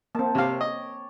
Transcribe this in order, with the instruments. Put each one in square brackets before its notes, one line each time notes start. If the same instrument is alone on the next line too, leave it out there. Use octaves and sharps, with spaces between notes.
[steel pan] A#3 C4 [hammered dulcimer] A5
[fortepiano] C3 F5 [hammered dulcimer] C#5 G5 D6
[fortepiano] D#5